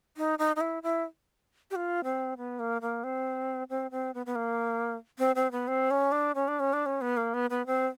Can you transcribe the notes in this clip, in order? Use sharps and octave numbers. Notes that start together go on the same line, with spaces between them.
D#4
D#4
D#4
E4
E4
G4
F4
C4
B3
A#3
A#3
C4
C4
C4
B3
B3
A#3
C4
C4
B3
C4
C#4
D4
C#4
D4
C#4
D4
C#4
B3
A#3
B3
B3
C4